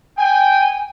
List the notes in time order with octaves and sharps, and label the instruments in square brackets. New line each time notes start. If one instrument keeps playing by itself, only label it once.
[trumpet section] G5 [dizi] G#5